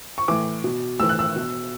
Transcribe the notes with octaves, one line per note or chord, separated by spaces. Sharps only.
C#6
A2 E3 D6
B2
A2 E3 E6
F#6
E6
B2